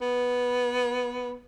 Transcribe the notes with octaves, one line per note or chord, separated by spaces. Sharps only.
B3